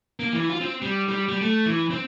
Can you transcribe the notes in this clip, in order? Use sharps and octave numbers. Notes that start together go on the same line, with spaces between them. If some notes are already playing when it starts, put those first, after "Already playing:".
A#3
E3
F4
C4
G3
G3
G3
A3
E3
C4